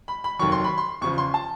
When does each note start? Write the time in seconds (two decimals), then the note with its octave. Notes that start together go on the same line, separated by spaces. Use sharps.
0.08 B5
0.24 B5
0.39 F1 D#2 D#3 F#3 C#6
0.52 C6
0.64 B5
0.78 C6
1.01 E2 C#3 F3 C#6
1.18 C6
1.34 A5